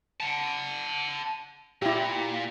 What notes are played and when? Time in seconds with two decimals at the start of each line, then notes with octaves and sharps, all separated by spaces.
0.20 F#5 A5
1.82 A#2 E4 G4